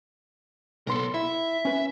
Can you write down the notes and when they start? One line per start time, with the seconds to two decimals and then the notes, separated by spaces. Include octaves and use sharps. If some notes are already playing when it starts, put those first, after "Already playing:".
0.87 B1 B3 A4 A#4 C6
1.14 E4 E5
1.65 C#4 B4